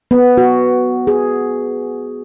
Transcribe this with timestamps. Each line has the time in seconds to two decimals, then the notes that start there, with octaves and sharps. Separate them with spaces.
0.11 B3
0.37 F#4
1.07 G#4